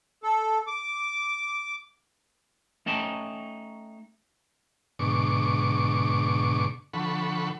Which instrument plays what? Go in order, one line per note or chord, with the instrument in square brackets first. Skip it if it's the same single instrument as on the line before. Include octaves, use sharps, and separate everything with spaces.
[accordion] A4
D6
[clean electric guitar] A3 C#4 D#4 G5 A5
[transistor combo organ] G#2 B2 D3 C#6 D6
D3 F3 A4 F#5 B5 C#6